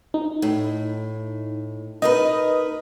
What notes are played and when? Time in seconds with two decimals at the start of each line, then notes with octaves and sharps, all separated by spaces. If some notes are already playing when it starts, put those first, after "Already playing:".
0.14 D#4
0.42 A2
2.02 D#4 A#4 B4 D#5